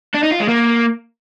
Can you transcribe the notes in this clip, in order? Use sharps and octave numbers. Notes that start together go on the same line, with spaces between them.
D4
D#4
F4
G#3
A#3